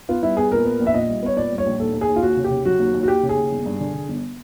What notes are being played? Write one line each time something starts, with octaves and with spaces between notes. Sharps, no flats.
B3 F4
G3 E4
B3 G#4
A#2 A#4
B3
A#1
E5
A#2 D#5
G3
B3 C#5
A#2 D5
G3
C#5
A#1
D#2 A4
D#2
G#4
D#2
F4
D#2 F#4
C#3
G4
C#3
F#3 F#4
D#2
D#2
F#4
D#2 G4
C#3
G#4
D#2
G1
G2
D3
D3
G1